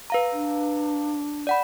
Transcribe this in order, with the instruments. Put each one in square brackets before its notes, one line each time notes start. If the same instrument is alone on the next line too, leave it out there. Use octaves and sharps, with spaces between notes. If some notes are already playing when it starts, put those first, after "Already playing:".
[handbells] B4 F5 A#5
[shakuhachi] D4
[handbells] D5 F#5 B5